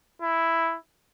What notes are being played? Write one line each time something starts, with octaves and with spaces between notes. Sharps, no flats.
E4